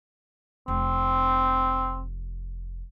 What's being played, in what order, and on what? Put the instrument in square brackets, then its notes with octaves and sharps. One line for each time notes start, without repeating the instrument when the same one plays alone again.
[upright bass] F1 [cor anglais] C4